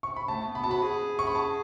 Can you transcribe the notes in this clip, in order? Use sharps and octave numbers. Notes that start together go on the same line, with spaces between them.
C#6
B5
A3 A5
B3
B5
F#4 A5
B5
G#4
C#6
B5
A5